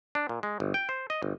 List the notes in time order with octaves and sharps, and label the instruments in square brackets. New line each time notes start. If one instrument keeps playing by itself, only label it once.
[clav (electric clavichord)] D4
A#2
G#3
G1
G5
C5
D#5
G1